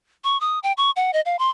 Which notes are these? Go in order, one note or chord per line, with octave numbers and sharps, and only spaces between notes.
C#6
D#6
G5
C#6
F#5
D#5
F5
C6